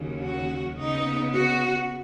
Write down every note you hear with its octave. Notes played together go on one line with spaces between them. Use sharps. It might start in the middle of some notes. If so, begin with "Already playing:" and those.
Already playing: D#2 C#3 F#3 C#4
F#4
C#3 B3 D#4
F#4